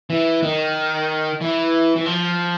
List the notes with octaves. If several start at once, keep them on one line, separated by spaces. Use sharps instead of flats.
E3
D#3
E3
E3
F3